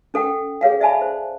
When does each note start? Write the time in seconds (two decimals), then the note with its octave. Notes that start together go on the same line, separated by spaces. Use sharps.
0.14 C#4 A4 F#5 G5
0.61 G#4 C#5 F5 F#5
0.80 D5 E5 F#5 G#5 A5 B5
1.02 C5